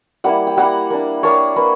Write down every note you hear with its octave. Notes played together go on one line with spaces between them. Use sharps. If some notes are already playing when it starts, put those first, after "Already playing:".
G3 A#3 E4 F#5
G5
G3 A#3 E4 F#5
A#3 D4
A#3 D4 C#5
A#3 B4